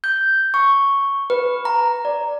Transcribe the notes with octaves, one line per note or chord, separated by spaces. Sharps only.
G6
C#6
B4
A#5
D5